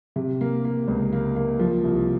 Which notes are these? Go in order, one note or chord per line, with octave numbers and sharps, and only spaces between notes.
C3
A#3
A#3
C#2
A#3
A#3
F3
C2